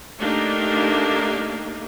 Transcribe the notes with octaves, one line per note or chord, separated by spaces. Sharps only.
A3 A#3 D4 D#4 G4